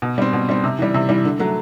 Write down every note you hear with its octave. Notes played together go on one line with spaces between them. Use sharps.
B2
G3 C4
B2
G3 C4
C3
E3 G3
C3
E3 G3
D3
F#3 A3